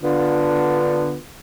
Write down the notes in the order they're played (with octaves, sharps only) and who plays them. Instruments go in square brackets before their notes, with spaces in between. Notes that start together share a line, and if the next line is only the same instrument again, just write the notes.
[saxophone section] D3 B3 D4 F4